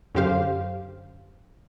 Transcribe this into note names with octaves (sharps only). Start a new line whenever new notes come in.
F#2 D3 G4 C5 F5